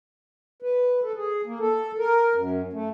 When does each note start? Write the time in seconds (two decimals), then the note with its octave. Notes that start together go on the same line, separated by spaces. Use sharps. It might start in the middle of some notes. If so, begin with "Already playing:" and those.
0.62 B4
1.03 A4
1.16 G#4
1.46 A#3
1.60 A4
1.98 A#4
2.34 F#2
2.73 A3